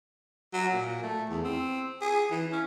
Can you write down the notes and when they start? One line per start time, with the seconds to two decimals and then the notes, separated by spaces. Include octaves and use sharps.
0.54 F#3
0.74 A#2
1.03 A3
1.30 E2
1.45 C4
2.01 G#4
2.31 E3
2.52 C#4